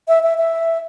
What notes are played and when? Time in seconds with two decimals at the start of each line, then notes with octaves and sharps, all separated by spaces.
0.08 E5
0.23 E5
0.38 E5